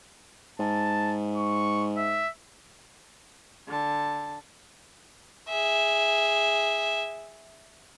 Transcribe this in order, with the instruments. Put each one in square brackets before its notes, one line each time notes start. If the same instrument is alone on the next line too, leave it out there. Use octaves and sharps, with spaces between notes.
[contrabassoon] G#2 [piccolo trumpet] A5
[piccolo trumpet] C#6
E5
[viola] D3 A5
[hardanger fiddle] G#4 E5